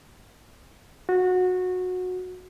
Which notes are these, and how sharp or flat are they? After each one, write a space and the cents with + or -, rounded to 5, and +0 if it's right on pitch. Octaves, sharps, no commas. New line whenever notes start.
F#4 -20